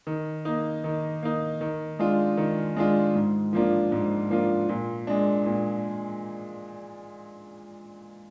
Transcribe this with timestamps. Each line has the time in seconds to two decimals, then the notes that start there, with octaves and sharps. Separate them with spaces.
0.07 D#3
0.45 A#3 D#4
0.84 D#3
1.22 A#3 D#4
1.61 D#3
1.99 G#3 D4 F4
2.37 D#3
2.76 G#3 D4 F4
3.15 G#2
3.53 F3 A#3 D4 F4
3.92 G#2
4.30 F3 A#3 D4 F4
4.69 A#2
5.07 G#3 D4
5.46 A#2